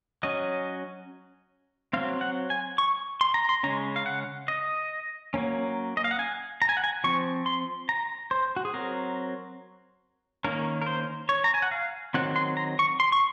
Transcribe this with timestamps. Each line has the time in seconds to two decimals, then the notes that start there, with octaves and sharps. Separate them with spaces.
0.23 F#3 C#4 D#5
1.93 F#3 C4 F5
2.21 F#5
2.50 G#5
2.78 C#6
3.21 C6
3.34 A#5
3.49 C6
3.63 C#3 G#3 C#4 A#5
3.96 F5
4.06 F#5
4.48 D#5
5.34 F#3 A#3 C#4
5.97 D#5
6.04 F5
6.11 F#5
6.19 G#5
6.62 A#5
6.69 G#5
6.77 F#5
6.84 G#5
7.04 F3 C4 C#6
7.46 C6
7.89 A#5
8.31 C5
8.57 F#4
8.65 G#4
8.73 F#3 C4 A#4
10.44 D#3 A#3 C#4 A#4
10.82 A#4
10.86 C5
11.29 C#5
11.44 A#5
11.54 G#5
11.62 F#5
11.71 F5
12.14 D#3 F#3 C4 F#5
12.36 C6
12.57 A#5
12.79 C#6
13.00 C6
13.12 C#6